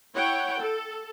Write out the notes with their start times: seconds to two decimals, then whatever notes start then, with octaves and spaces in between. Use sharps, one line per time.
0.14 E4 C#5 F#5 G5
0.58 A4